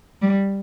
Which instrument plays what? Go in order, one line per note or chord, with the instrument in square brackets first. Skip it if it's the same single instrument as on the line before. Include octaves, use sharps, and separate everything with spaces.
[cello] G3